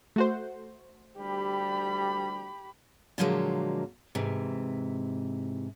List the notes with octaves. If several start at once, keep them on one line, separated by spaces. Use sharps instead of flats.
A3 F#4 C5
D2 G3 G4 B5
A#2 D3 F3 F#3 G#3 A#3
G#2 C3 E3